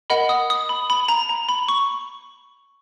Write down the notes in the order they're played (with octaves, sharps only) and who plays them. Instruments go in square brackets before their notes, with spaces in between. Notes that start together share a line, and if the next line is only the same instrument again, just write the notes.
[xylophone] A#4 D#5 F#5 B5
D#6
D#6
B5
B5
A#5
A#5
B5
C#6